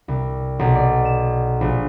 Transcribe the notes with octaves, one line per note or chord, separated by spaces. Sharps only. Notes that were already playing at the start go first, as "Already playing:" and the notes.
C2
B1
D5
E7
A#1